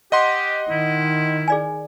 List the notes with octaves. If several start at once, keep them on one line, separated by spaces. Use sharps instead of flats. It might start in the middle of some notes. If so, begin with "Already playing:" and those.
G4 D#5 F#5 C6
D#3 E4
G#4 D5 G#5